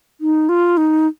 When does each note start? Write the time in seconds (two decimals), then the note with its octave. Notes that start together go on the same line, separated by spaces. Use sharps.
0.21 D#4
0.49 F4
0.77 D#4